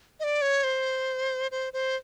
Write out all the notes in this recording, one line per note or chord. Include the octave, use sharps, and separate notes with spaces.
D#5
D5
C#5
C5
C5
C5